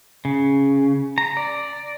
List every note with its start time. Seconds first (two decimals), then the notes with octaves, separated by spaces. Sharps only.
0.25 C#3
1.18 A#5
1.37 D5